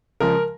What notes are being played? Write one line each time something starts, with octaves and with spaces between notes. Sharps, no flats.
C#3 F3 G#3 A#4